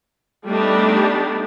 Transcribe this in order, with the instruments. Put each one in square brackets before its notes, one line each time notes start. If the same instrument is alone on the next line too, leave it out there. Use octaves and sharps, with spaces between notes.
[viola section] G3 A3 B3 D4 D#4 G4